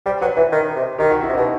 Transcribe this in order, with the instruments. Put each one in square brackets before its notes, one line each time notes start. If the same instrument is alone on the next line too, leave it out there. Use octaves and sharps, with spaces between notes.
[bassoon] G3 [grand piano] C5
[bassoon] F#3 [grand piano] B4
[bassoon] E3 [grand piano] B4
[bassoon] D#3
C3
[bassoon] D#3 [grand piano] G4
[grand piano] F#4
E4
[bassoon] C3
[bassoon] B2 [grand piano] D#4